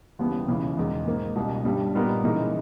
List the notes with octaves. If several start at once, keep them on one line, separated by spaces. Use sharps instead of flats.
D#2 C#3 E3 G3 B3
C#2 C#3 E3
E1 E2 D#3 G#3
G#2 D#3 A#3
C#2 B2 G3
G1 G2 G3
A#2 G3 B3 D#4 A#4
C#3 E3 G#3 D#4 A#4